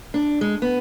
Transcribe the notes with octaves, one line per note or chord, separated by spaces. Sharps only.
D4
G#3
B3